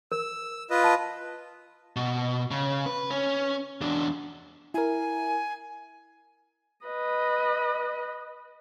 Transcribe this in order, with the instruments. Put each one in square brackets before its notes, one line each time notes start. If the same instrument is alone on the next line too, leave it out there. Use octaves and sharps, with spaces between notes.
[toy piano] A#4 [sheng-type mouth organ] E6
[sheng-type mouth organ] F4 B4 D#5
[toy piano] A5
[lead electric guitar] B2
C#3
B4
C#4
E2 D4
[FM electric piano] E4 A#4 [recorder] G#5
[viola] B4 D#5